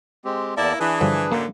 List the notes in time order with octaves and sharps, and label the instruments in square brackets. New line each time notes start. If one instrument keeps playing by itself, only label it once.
[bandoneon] G#3 C4 G4
[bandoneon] E2 D5 A5 [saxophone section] A#3 E4
[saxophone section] E3 [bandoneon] D4 G#4 B4
[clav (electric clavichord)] G2 D3 F3
[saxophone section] F#2 A2 D3 [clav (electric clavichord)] A#3